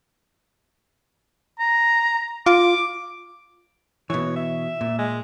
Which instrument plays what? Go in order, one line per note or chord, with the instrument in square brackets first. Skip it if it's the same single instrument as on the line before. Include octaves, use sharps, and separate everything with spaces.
[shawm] A#5
[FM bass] F4 [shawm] D6
[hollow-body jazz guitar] B2 E3 [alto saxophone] C#5
[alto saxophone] E5
[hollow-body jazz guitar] A#2
[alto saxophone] G#3